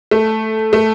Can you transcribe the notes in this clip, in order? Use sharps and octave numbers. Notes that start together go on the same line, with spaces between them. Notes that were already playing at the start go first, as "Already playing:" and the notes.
A3
A3